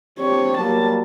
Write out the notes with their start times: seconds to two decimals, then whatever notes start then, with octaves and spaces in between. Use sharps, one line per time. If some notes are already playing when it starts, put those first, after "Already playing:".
0.19 C4 D4 G4 C#5
0.58 F#3 G3 A#3 A5